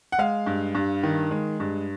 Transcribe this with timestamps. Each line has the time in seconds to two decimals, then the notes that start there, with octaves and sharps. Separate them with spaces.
0.12 F#5
0.19 G#3 F5
0.46 G2
0.75 G2
1.03 D#3
1.31 G#3
1.60 G2